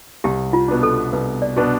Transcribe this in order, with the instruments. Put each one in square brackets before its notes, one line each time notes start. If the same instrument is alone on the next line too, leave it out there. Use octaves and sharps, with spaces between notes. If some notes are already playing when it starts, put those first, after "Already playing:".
[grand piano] C2 [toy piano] G4
[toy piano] F4
[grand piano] B2 B3 D4
[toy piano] A4
[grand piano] C2 [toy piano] B4
[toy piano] D5
[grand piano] B2 B3 D4